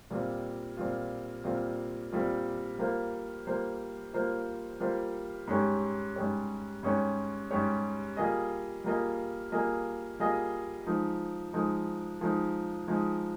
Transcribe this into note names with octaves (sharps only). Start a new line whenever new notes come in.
A#2 G3 C4 F4
A#2 G3 C4 F4
A#2 G3 C4 F4
A#2 G3 C4 F4
G3 A#3 F4 C5
G3 A#3 F4 C5
G3 A#3 F4 C5
G3 A#3 F4 C5
G#2 G3 C#4 G4 C#5
G#2 G3 C#4 G4 C#5
G#2 G3 C#4 G4 C#5
G#2 G3 C#4 G4 C#5
G3 A#3 F4 G#4 D#5
G3 A#3 F4 G#4 D#5
G3 A#3 F4 G#4 D#5
G3 A#3 F4 G#4 D#5
F3 G#3 D#4
F3 G#3 D#4
F3 G#3 D#4
F3 G#3 D#4